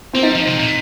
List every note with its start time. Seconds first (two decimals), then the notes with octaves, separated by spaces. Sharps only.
0.13 A#3 C4
0.23 G3 D#4
0.35 F3
0.47 C3
0.60 A#2